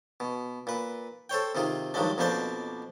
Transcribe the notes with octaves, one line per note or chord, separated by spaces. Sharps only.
B2
A#2 B4
A4 C5 C#5 G5
C3 D#3 F4 G#4
G2 D#3 F3 F#3 G#3 D4
F2 B2 A#3 D4 C5 D5